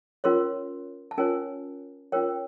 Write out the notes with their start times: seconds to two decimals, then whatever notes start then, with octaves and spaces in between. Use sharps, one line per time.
0.24 C#4 F4 A#4 C#5 C6
1.11 A5
1.18 C#4 F4 A#4 C#5 G#5
2.12 C#4 F4 A#4 C#5 G5